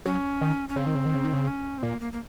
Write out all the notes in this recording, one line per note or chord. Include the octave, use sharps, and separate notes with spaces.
F#3 C#4
D#3
C#4
C#3 C4
D#3
C#3
D#3
C#3
D#3
C#3
C#4
C4
A#2 A#3
A#3
A#3